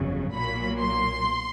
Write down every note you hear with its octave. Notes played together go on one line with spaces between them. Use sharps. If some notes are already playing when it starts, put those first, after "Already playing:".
Already playing: G1 F2 C#3 F#3
B1 A#2 F#3 A#3 B5
C6